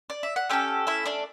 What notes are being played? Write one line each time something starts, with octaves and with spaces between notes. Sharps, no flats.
D5
E5
F#5
A3 C#4 G4 A4 G5
E4 E5
D4 D5